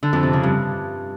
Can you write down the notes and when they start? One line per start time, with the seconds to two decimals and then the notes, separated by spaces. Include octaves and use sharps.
0.03 D3
0.13 F2
0.23 C3
0.33 C#3
0.43 G2